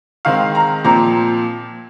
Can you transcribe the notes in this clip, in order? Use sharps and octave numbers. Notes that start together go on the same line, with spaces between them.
D#3 G#3 C4 F5
A#5
A#2 F3 C4 A#5